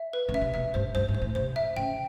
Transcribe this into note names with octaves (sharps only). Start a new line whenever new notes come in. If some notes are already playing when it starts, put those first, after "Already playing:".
Already playing: E5
B4
C#3
E5
C3
B2 E5
G2 C5
G2 C5
G#2
C5
A2
C3 C5
E5
C#3 G5